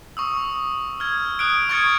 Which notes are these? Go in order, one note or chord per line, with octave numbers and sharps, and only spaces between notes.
C#6 D#6 E6
F6 G#6
D#6 F#6 D7
C#6 F6 G#6 A6 C#7